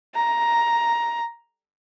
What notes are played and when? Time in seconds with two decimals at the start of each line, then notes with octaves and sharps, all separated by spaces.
0.16 A#5